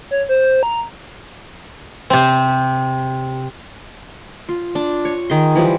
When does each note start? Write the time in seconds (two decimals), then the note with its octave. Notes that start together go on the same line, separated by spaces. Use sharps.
0.11 C#5
0.29 C5
0.63 A#5
2.10 C3 C4
4.49 F4
4.75 D4
5.05 C#5
5.30 D#3 G#4 C6
5.55 E3 F3 G3